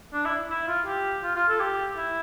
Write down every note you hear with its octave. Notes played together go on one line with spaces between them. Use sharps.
D4
E4
E4
F4
G4
F4
F4
A4
G4
E4